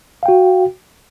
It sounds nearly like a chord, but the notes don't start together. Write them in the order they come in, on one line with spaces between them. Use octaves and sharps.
F5 G5 F#4